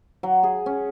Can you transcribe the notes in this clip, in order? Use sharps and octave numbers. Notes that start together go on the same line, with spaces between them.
F#3
G#4
C#4